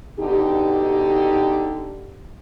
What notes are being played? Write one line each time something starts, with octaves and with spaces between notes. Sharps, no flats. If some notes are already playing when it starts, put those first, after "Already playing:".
B2 D3 D#4 G4